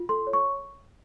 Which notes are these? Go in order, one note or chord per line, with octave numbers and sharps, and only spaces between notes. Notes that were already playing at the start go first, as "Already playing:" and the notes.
Already playing: F4
A4 C6
C#5
C#6